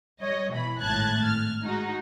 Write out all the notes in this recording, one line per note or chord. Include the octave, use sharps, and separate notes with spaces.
G3 C#5 D#5
B2 E3 B5
G#1 A2 A5 F#6 G#6 A6
F6
G#3 D#4 F#4